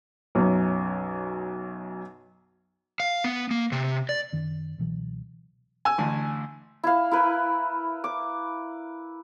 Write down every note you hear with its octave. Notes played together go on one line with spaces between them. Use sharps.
B1 F#2
F5
B3
A#3
C3
D5
F#2 D#3
C#2 B2 E3 F#3
G#5 E6
A1 D2
E4 F5
E4 A#4 B4
D6